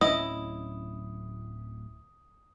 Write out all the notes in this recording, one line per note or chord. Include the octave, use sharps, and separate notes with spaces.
D1 C#4 E4 D#5 D#6